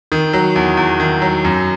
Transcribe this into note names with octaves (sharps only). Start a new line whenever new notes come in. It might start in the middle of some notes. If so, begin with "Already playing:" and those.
D#3
F#3
E2
E2
D#3
F#3
F#2